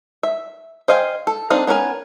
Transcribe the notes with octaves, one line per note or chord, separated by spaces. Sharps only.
E5
C5 D#5 F5 G5 G#5
A4
C4 D4 D#4 D#5 F5
B3 C#4 D4 A#4 G#5